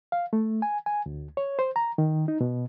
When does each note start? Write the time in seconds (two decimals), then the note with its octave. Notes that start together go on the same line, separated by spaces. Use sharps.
0.12 F5
0.33 A3
0.62 G#5
0.86 G#5
1.06 D2
1.37 C#5
1.59 C5
1.76 A#5
1.98 D#3
2.28 D#4
2.41 B2